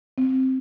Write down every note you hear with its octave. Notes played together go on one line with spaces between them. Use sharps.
C4